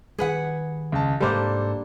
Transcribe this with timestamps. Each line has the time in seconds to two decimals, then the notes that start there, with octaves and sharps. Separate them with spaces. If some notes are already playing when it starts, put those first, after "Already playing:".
0.19 D#3 G3 G#4 B4 F#5
0.92 C#2 A5
1.20 G#2 C3 G3 A#3 D4 A4 C5